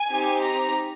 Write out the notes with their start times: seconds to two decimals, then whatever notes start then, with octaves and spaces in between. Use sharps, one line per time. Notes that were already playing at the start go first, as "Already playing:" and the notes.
Already playing: G#5
0.10 C4 D#4 G4
0.42 A#5